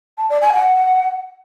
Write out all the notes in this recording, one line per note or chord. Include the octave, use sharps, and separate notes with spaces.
A5
D5
G#5
F#5